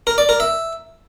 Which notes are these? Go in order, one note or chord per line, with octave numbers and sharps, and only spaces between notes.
A#4
D5
A#4
E5